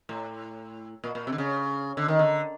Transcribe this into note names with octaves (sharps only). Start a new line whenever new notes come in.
A2
A#2
A#2
C3
D3
C#3
D3
D#3
D3